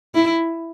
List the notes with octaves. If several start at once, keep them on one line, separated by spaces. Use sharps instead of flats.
E4